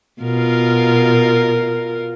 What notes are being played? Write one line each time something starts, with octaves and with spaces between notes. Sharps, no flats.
B2 F4 A#4